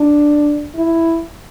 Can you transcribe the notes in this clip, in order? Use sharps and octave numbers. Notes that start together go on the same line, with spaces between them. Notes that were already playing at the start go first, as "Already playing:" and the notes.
Already playing: D4
E4